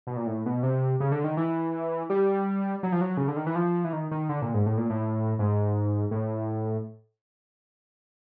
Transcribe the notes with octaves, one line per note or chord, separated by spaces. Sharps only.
B2
A#2
A2
B2
C3
C#3
D3
D#3
E3
G3
F#3
F3
F#3
C#3
D3
D#3
E3
F3
E3
D#3
D#3
D3
A#2
G#2
A2
A#2
A2
G#2
A2